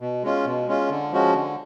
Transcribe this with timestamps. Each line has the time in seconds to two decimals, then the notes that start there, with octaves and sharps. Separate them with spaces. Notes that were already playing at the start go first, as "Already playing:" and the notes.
0.01 B2
0.23 G#3 C#4 F4
0.45 B2
0.67 G#3 C#4 F4
0.90 D3
1.12 F3 G#3 C#4 F#4
1.34 D3